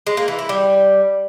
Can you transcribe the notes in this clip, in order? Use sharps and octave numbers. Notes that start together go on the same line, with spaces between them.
G#3
A#3
E3
E4
G3